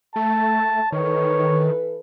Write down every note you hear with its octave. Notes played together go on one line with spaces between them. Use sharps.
A3 A5
D#3 E3 A4 B4 C#5